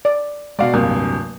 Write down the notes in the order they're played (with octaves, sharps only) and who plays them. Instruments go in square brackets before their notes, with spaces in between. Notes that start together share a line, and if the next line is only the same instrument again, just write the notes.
[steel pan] D5
[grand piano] B2 F#4 D5 [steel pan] G#3 F5
[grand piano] D1 G2 C3 [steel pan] A#3